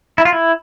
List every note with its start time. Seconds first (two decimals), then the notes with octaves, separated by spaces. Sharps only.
0.18 E4
0.25 F4
0.33 E4